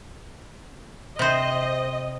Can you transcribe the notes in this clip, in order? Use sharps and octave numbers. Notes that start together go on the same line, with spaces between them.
C3 C5 D#5